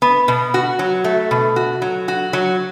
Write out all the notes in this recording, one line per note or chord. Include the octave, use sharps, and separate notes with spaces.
B3
B2
F#4
F#3
A3
B2
F#4
F#3
F#4
F#3